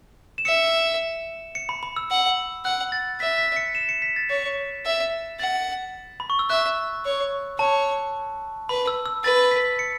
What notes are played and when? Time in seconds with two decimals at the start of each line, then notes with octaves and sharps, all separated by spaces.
0.38 E7
0.45 E5 C#7
1.55 C#7
1.69 B5
1.83 B5
1.96 E6
2.11 F#5
2.65 F#5 F#6
2.92 A6
3.20 E5 B6
3.38 B6
3.56 C#7
3.75 E7
3.89 C#7
4.02 B6
4.16 A6
4.30 C#5 A6
4.85 E5
5.40 F#5 A6
6.20 B5
6.30 C#6
6.39 E6
6.50 E5 F#6
7.05 C#5
7.59 C#5 A5
8.69 B4 B5
8.87 E6
9.06 E6
9.24 B4 A6
9.51 B6
9.79 C#7